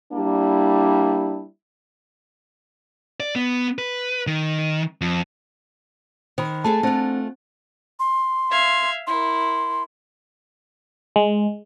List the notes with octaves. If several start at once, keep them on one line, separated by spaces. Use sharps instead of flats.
G3 A#3 D4 E4
D5
B3
B4
D#3
F2
D#3 C5 B5
A3 G#4 A4 A5
A3 C4 D4 F4 C5
C6
E5 F5 G#6
E4 A#4 C6
G#3